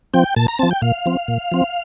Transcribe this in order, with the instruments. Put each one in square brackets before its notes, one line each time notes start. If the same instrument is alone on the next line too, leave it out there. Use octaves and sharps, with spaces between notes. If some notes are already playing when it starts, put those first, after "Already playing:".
[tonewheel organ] F3 C4 G5
A#2 A5
A#5
F3 C4 A5
G5
A#2 F5
F3 C4
A#2
F3 C4